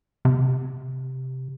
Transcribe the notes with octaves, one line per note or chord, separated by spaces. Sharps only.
C3